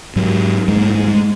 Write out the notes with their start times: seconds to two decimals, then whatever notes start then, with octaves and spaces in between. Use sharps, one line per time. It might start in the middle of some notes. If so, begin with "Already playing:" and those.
0.16 G#2 F#3
0.68 G#2 G#3
0.81 A3
0.95 G#3
1.08 G#3